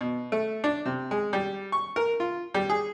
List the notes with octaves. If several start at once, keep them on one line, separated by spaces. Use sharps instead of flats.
B2
A3
D4
C3
G#3
G3
C#6
A#4
F4
G3
G#4